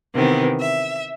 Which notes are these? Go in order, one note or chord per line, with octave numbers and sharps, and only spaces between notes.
C3 D#3 E3 B3
E5